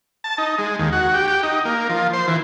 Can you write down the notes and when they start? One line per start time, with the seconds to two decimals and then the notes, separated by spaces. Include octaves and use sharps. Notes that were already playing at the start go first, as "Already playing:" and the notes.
0.24 A5
0.38 D#4
0.58 G#3
0.79 D#2
0.92 F#4
1.14 G4
1.28 G4
1.43 D#4
1.65 A#3
1.89 F3
2.13 C5
2.28 E3